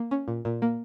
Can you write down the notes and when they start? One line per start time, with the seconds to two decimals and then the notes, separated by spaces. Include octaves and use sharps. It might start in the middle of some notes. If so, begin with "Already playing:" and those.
Already playing: A#3
0.11 C#4
0.28 A#2
0.45 A#2
0.62 A#3